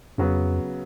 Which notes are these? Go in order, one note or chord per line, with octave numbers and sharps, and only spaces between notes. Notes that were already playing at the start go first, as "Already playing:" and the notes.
F2 C#3 F#3 B3